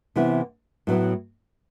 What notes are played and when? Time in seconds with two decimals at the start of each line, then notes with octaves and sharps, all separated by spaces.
0.16 C3 E3 B3 E4
0.87 A2 F#3 B3 E4